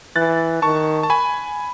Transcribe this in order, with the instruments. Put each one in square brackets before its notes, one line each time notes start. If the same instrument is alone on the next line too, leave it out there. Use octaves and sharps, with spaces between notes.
[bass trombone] E3 [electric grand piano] F#6 A6
[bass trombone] D#3 [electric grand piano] A5 C#6
[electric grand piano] A5
G#5 B5